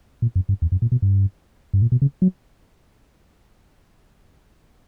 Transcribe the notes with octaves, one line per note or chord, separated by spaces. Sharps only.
A#2
F#2
G2
E2
F#2
A#2
B2
G2
G2
A#2
B2
C#3
F#3